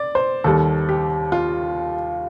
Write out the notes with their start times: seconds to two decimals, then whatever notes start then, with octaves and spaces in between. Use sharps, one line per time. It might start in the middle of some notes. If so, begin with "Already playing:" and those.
Already playing: D5
0.15 C5
0.44 D#2 D#3 G3 A4
0.89 G4
1.32 F4